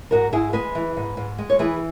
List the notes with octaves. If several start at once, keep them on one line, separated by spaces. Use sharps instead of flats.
G#2 F#4 A#4
G#2 E4 G#4
G#3 G#4 B4
E3
G#2
G#2
G#3
C#5
E3 G#4 B4